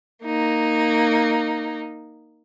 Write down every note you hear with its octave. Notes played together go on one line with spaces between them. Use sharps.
A#3 D#4